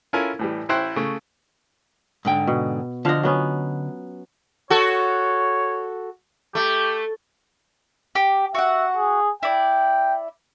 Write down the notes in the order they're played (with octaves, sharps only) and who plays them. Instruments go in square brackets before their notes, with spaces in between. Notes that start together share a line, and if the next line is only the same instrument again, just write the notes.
[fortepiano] C#4 E4 F4 A4 A#4 G#5
A2 E3 G3
A1 E4 C5 G5 F#6
C#3 A3
[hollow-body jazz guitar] G#2 D3 G5
[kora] B2
[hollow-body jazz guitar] D3 D#5 [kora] F3 D4 F5
[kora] F#3 B3 C#4
[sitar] F#4 A4 [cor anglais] C#5
[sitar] A3 [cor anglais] G4
[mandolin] G4
[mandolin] F#4 F#5 [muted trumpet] E5
[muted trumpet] G#4
[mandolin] E4 D5 [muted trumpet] G5